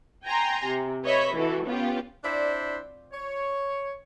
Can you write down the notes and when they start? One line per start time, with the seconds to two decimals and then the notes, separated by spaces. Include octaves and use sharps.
0.24 G5 G#5 A#5 C6
0.66 C3
1.03 B4 C#5 D#5 E5 B5
1.35 E3 F#4 A4
1.65 B3 C#4 F4 G4
2.24 C4 D4 E4 F4 C5 D5
3.13 C#5